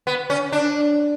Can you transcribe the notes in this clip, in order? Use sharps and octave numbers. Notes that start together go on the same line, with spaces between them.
B3
C#4
D4